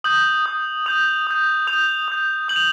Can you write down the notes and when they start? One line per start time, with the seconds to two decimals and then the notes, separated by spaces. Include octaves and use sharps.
0.04 D#6 G6 F#7
0.46 D#6 G6
0.86 D#6 G6 F7
1.27 D#6 G6
1.67 D#6 G6 F7
2.08 D#6 G6
2.48 D#6 G6 F#7
2.56 F7